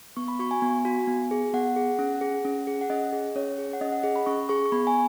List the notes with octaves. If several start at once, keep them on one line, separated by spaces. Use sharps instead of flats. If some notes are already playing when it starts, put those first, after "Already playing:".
B3 C#6
B5
F#4 C#6
G#5
B3
F#4
B3
G#4
B3 F#5
G#4
C#4
G#4
C#4
G#4
F#5
C#4 D#5
G#4
C#4 C#5
G#4
F#5
C#4 D#5
F#5
G#4 D#5
B5
C#4 C#6
G#4 C#6
C#6
B3 B5
G#5